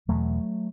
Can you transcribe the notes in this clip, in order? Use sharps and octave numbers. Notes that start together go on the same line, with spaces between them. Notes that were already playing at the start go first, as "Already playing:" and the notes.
E1 E2 B2 F#3 A3